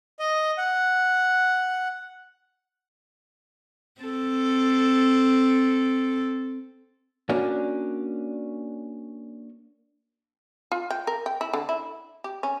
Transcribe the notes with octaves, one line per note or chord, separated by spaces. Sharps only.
D#5
F#5
C4 A4
A#3 C#4 D4 F#4
F4
G5
A#4
G5
E4
D3
E4
G4
C#4